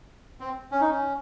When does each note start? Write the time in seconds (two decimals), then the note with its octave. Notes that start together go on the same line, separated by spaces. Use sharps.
0.40 C4
0.71 C#4
0.81 D#4
0.91 C#4